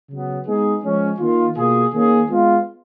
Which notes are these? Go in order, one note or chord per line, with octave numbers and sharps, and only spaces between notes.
C#3 F#3 B3
G#3 B3 D#4 G#4
F3 G#3 C#4
D#3 A#3 F4
B2 A#3 F4 G#4
D#3 A#3 C#4 G#4
G#3 B3 F4